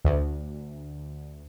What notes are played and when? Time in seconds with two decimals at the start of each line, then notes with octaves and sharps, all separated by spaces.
0.05 D2